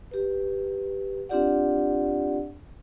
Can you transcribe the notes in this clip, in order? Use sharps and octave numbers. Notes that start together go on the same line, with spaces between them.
G4 B4
C4 D4 F4 G4 D5 F#5